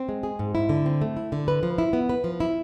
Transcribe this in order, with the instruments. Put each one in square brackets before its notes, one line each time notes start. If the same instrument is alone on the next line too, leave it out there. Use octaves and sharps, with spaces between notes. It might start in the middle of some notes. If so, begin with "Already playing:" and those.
Already playing: [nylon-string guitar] C4
G#3
G#4
G#2
E4
D3
C4
A3
E4
D3
B4
F3
E4
B3
B4
F3
E4